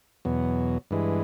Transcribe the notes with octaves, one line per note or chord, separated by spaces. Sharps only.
E2 B2 F#3
G2 E3 G#3